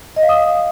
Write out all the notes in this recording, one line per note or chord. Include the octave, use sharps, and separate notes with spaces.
D#5
F5
D#6